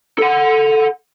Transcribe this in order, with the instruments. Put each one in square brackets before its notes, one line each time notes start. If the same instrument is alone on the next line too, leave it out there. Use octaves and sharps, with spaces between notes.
[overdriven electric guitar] A4 F#5